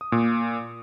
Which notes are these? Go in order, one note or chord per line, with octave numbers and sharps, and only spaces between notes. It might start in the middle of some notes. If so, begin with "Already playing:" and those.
D#6
A#2